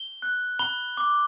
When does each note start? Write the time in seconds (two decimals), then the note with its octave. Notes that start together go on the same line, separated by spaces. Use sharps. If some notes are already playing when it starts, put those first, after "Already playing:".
Already playing: G7
0.22 F#6
0.59 B5 G7
0.97 D6